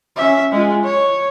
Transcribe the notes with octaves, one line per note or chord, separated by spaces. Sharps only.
C#4 E5
G#3 F4
C#5